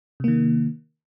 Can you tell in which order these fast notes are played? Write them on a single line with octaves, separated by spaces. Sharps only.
C3 A#3 D#3